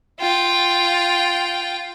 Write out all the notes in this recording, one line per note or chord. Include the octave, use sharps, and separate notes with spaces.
F4 G5